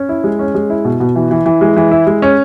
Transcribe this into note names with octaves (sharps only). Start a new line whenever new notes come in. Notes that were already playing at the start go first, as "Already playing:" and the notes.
Already playing: C#4
E4
G#3
C#4
G#3
E4
B2
B2
E3
E3
E3
G#3
E3
E4
G#3
C#4